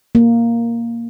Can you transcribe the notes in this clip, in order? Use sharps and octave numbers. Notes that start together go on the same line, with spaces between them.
A#3